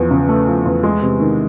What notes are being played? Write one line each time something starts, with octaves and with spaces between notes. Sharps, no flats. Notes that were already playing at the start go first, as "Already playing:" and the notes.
Already playing: E2 F3
C#3
A3
F3
E2
G#3
C3
D#3